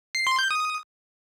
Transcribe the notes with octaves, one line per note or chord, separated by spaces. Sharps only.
C7
C6
G6
D#6